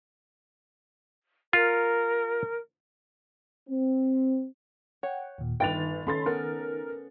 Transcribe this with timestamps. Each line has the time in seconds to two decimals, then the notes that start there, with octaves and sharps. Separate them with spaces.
1.53 F4 A#4
3.69 C4
5.03 C#5 F#5 G5
5.38 D#2 A#2
5.60 G1 D#3 D#4 B4 G5 A6 F7
6.07 C#4 A4 B5 C6 A6
6.26 B3 A#4